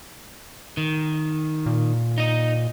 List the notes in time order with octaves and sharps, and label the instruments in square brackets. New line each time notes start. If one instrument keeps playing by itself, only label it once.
[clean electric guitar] D#3
[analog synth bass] A#2
[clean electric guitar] D#4 D#5